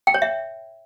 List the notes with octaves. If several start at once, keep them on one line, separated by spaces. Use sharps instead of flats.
G5
C#5
E5